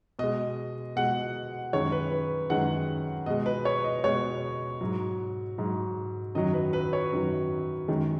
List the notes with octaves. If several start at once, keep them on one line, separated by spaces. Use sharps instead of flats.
B2 G#3 D#5
B2 G#3 F#5
F#2 D#3 G#3 C#5
B4
B4
F#2 D#3 G#3 F#5
B2 G#3 D#5
B4
C#5
D#5
B2 G#3 C#5
G#2 F#3
G#2 F#3
F#2 D#3 F#3 D#5
B4
B4
C#5
F#2 D#3 F#3
F#2 D#3 G#3